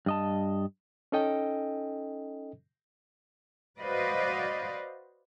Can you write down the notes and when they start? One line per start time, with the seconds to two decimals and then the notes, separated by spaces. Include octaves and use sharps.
0.06 G2 D#5 A5
1.12 C#4 D#4 A4 D#5 G5
3.79 F#4 B4 C5 D5 D#5 F5